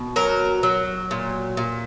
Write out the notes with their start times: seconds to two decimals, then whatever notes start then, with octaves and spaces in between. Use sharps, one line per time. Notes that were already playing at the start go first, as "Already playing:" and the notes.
Already playing: B2
0.16 F#3 A#4
0.63 F#3
1.11 A#2
1.57 A#2